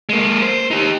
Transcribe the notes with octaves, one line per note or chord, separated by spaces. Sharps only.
G#3 A#3
C5
D#4 G4